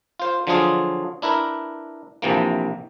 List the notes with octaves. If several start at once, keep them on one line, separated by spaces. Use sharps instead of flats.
F4 C5
D3 F3 F#3 D4 F4 G#4
D4 E4 A#4 B4
A#1 C3 E3 A#3